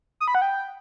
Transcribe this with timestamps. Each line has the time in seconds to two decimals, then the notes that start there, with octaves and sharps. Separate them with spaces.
0.20 D#6
0.28 B5
0.35 F#5
0.42 G5